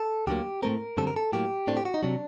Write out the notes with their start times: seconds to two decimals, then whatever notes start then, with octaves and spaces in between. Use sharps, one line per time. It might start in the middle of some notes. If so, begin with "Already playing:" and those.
Already playing: A4
0.27 D2 D3 F#3 A#3 G4
0.62 A2 A3 C4 A#4
0.97 F#2 D3 G3 C4 A4
1.07 A#4
1.16 A4
1.32 A2 F#3 A#3 G4
1.67 A2 A3 C4 D4
1.77 G4
1.85 F#4
1.94 D#4
2.03 C3 F#3 D4